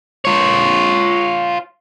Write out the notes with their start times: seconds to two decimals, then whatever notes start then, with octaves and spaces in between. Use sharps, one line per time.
0.25 F4 C#5